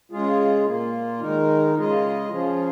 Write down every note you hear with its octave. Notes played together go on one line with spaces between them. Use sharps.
C#3 G#3 F4 G#4
A#2 A#3 F4
D#3 G#3 D#4 A#4
C#3 G#3 F4 G#4 D#5
C#3 F3 C#4 F4 G#4